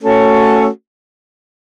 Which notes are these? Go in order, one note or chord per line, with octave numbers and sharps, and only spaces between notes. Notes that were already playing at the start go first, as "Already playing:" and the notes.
A3 C#4 F#4 A4 C#5